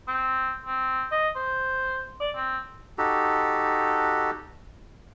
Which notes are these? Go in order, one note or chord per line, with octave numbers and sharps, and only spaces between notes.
C4
C4
D#5
C5
D5
C4
D#4 F#4 G4 A4